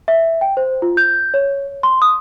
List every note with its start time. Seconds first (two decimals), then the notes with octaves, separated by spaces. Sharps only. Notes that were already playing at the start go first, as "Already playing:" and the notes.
0.08 E5
0.41 G5
0.57 C5
0.82 F4
0.97 G6
1.34 C#5
1.83 C6
2.02 D#6